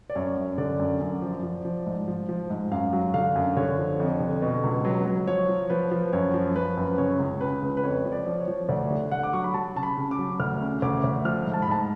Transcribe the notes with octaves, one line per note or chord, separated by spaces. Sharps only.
D5
F#2 C#5
F#2
D3 D5
F#2
F#2
F3
F3
F3
G#2
F3
F3
G#2
F#2 F5
F#3
D3 F5
F#2
D3 C#5
F3
F2
D3
B2
C#2
F#3
F#3
F3 C#5
F3
F3 B4
F3
F#2 C#5
F3
F3 B4
F#2
C#3 C#5
C#2
C#3 B4
C#2
B4
F2 C#5
F3
D5
F3
C#5
F3
D2 D5
D3
D3 F#5
D6
F#3 C#6
B5
F#3 A5
C#3 A5
B5
C#3
D6
F#3
D2 F6
C#3
D2 D6
D2
F3 F6
G#2
A5
B5
G#2 A5